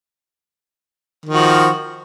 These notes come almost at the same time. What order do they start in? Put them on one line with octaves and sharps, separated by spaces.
D#3 F3 F#4